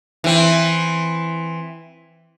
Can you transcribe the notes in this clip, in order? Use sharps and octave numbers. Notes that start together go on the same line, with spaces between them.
E3 C4